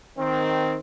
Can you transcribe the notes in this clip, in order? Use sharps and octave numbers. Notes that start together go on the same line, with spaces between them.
D#3 C4